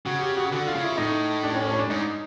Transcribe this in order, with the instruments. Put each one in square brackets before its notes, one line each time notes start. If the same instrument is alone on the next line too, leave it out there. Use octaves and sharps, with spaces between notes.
[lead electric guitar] C#3 [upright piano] F#4
[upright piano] G4
F#4
[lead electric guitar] D3 [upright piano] F#4
[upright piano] F4
[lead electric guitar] C#3
[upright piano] E4
[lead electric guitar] A2 [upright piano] D#4
[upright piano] D4
C#4
C#4
D4
[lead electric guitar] G#2 [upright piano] D#4